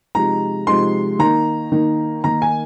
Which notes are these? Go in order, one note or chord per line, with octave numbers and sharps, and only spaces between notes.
C3 F3 G#3 D#4 A#5
C3 F3 G#3 D#4 C6
D#3 A#3 D#4 A#5
D#3 A#3 D#4
D#3 A#3 D#4 A#5
G#5